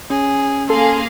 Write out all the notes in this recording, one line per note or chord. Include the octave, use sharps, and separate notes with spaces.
C#4 G#4
A#3 G#4 A4 F5 C6